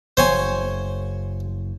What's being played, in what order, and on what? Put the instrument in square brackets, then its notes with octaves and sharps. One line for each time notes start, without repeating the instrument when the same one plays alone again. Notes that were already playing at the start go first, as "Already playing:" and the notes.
[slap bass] F#1 [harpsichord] C5 C#5 G#5